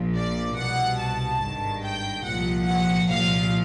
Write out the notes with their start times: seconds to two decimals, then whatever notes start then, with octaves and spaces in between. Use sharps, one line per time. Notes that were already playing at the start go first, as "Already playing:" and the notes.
Already playing: A#1 A#2 F3
0.15 D5
0.57 C2 B2 F#5
1.00 A5
1.42 G#1 G2 D#3
1.83 G5
2.25 C2 A#2 F3 F#5
2.67 F#5
3.08 C2 A#2 F3 F5